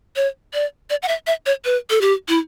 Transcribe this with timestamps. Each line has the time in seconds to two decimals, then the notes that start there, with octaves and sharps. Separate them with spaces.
0.16 C#5
0.54 D5
0.90 D5
1.02 F#5
1.08 E5
1.27 E5
1.46 C#5
1.65 B4
1.90 A4
2.01 G4
2.28 E4